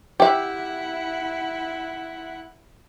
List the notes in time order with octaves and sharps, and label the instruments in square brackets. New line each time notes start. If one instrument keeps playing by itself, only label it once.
[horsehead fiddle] E4 F#5 [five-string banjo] G4 E5